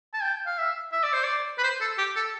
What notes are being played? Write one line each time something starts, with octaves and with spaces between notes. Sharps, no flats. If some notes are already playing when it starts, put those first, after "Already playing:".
A5
G5
F5
E5
E5
D5
C5
D5
B4
C5
A4
G4
A4